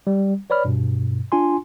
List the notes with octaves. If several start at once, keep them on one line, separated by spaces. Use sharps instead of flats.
G3
B4 C#5 D5 B5 F6
G2 B2
D4 F4 G#5 C6